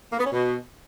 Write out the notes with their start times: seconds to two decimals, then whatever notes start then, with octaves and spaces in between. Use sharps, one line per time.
0.12 A#3
0.19 B3
0.25 C#4
0.32 B2